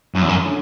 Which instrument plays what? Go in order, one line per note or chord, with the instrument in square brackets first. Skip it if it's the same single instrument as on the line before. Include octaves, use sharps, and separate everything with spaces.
[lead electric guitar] F#2 [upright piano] C#4
[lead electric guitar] E2
F#2
[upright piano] D3